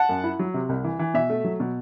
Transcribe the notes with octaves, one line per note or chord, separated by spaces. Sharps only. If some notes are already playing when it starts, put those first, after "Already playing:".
Already playing: F#5 A5
F#2
E4
F#3
C3
C2
E3
E3
B2 E5
A3
F#3
B2